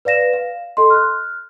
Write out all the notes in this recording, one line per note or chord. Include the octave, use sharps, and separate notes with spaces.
B4 D5 F5 A#6 E7
F5
A4 D#5 C6
F6 F#6